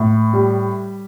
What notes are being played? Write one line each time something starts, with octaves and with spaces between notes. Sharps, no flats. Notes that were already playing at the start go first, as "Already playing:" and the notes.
Already playing: A2
G3